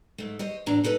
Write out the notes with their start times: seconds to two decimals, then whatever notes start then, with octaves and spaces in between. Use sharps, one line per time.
0.18 G#2 A3
0.39 C5 C#5 D#5
0.66 E2 A2 D4 A#5
0.84 D#4 A4 B4 C5 D#5